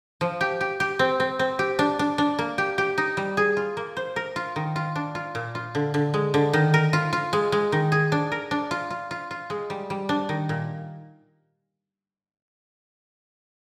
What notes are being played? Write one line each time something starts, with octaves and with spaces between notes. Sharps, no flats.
F3
G4
G4
G4
C4
C4
C4
G4
D4
D4
D4
A#3
G4
G4
D#4
G3
G#4
F4
A#3
C5
A#4
F4
D#3
F4
D4
F4
A#2
F4
D3
D3
G#3
D3
D#3
A#4
F4
F4
G#3
G#3
D#3
G#4
D4
A#4
D4
F4
F4
F4
F4
G#3
G3
G3
D4
D#3
A#2